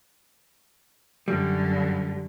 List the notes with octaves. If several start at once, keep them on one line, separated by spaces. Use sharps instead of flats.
F#2 D3 G3